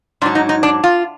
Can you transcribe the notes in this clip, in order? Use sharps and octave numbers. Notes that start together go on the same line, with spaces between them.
G#2 F#3 D4
D#4
D#4
D4
F4